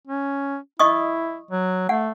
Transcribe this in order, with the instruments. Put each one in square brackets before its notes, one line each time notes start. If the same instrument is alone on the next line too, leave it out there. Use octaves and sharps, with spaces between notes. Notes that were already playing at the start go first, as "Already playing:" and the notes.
[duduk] C#4
[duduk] E4 [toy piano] D#5 C#6 D#6
[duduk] F#3
[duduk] A3 [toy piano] F#5